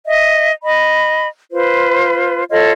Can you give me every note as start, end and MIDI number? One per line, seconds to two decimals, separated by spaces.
0.06 0.51 75
0.06 0.51 76
0.63 1.27 75
0.63 1.27 83
1.52 2.43 65
1.52 2.43 71
1.52 2.43 72
2.50 2.72 65
2.50 2.72 69
2.50 2.72 73
2.50 2.72 75